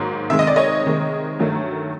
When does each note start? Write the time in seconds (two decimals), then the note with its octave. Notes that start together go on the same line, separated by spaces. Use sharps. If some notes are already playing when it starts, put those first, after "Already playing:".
Already playing: G#2 D#3 F#3 A#3
0.30 C3 D#3 G#3 E5
0.39 D#5
0.47 D5
0.56 C#5 D#5
0.84 C3 D#3 G#3
1.39 G2 D#3 F#3 A3